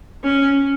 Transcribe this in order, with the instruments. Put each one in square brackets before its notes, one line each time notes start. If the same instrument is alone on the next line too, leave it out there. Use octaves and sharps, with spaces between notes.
[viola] C#4